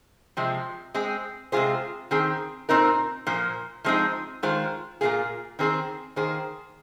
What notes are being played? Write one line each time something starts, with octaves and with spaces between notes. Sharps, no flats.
C3 F3 G#3 C4
G#3 C4 G#4
C3 G#3 F4 G#4 C5
D#3 C4 G#4
A#2 F3 C4 D#4 A#4
A#2 F3 A#3
F3 G#3 C4 D#4 G#4
D#3 G#3 F4 C5
A#2 F3 A#3 F4 G#4
D#3 C4 G#4 C5
D#3 A#3 G#4 C5